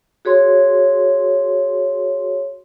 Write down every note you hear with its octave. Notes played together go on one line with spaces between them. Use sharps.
F#4 G#4 C#5 C6